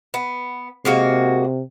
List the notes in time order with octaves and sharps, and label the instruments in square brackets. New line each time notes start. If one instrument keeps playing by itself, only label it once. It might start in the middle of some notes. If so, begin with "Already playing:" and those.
[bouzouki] B3
[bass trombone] C3 [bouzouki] G#3 A#3 F#4